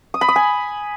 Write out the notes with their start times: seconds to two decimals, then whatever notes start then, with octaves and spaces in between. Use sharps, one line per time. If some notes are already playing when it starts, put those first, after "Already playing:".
0.14 D#6
0.21 B5
0.28 D#6
0.36 G#5